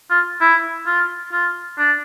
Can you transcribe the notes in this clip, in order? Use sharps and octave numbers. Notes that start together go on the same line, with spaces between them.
F4
E4
F4
F4
D4